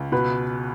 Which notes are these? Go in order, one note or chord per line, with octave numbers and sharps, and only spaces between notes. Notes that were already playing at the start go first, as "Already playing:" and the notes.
Already playing: C#2
B2 B4